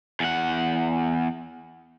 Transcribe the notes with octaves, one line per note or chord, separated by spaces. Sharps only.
E2 F#5